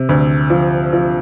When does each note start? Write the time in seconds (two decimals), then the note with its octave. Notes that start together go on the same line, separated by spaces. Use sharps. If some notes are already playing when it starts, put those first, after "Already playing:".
Already playing: C3
0.09 D2
0.50 F3
0.93 F3